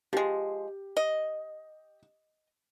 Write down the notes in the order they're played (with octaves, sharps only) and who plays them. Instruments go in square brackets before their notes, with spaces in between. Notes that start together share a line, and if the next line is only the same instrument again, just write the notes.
[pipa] F3 G#3 [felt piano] G4
[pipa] D#5